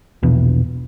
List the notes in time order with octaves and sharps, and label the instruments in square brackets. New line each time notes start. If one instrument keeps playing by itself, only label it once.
[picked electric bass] A#1 E2 B2